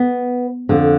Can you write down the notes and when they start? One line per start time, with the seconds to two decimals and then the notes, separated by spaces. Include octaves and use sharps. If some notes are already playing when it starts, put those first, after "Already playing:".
Already playing: B3
0.69 F2 D3